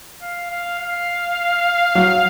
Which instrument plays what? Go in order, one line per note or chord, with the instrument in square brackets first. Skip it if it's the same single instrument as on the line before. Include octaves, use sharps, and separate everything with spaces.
[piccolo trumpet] F5
F5
F5
[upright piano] F#3